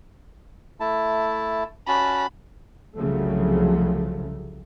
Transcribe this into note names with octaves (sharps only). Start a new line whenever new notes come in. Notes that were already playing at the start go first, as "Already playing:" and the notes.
A3 E4 A5
C#4 F#4 A5 B5
C2 C#3 F3 F#3 A3